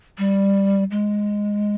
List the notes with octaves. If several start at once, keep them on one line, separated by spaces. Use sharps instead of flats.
G3
G#3